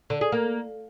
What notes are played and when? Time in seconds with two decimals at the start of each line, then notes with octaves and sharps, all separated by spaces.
0.10 D3
0.21 G#4
0.32 A#3